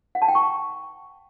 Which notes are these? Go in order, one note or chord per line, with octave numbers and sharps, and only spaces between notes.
F#5
A5
G5
C#6
A#5